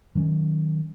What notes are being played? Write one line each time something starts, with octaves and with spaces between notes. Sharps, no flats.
D#3 F#3 B3 C#4